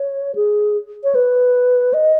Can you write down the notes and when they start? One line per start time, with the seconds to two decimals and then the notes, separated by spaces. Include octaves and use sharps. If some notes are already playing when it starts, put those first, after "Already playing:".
Already playing: C#5
0.35 G#4
1.04 C#5
1.15 B4
1.93 D#5